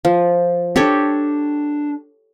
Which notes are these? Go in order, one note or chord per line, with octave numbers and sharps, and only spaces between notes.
F3
C4 D4 G4 A4 C#5